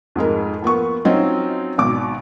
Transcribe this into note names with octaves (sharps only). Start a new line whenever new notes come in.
F2 G#2 G#3 A#4
F3 A#3 B3 C#6
F#3 C4 C#4 D#4 F4
G#1 B2 D6